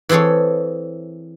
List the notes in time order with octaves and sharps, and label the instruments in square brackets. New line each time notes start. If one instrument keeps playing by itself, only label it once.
[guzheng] E3 C4 G#4 A4 C#5